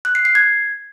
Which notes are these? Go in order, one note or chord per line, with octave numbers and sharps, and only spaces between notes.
F#6
C7
C7
G#6